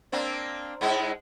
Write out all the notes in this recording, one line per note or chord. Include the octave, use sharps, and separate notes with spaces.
A#3 C4 D4
G#2 G#3 E4